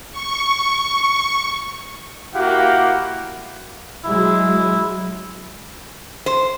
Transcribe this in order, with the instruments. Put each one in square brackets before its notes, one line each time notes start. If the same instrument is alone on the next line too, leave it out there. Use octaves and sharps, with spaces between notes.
[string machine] C#6
[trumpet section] A#3 E4 F#4 G4 F5 F#5
[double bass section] F#3 G#3 [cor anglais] E4
[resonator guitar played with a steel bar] C5